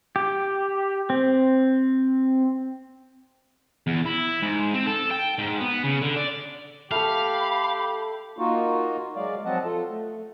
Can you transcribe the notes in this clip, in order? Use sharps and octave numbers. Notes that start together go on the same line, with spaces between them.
G4
C4
E2
E4
G#2
C4
A4
G5
G#2
B3
C#3
D3
D5
A3 G4 A4 F5 B5
A#3 D#4 F4 F#4
F#3 G#3 D5 F5
F3 F#3 C4 D#5 F#5 A5
F4 A4
A3